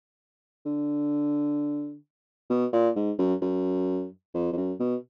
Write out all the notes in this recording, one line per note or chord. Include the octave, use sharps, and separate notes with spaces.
D3
B2
A#2
G#2
F#2
F#2
F2
F2
F#2
B2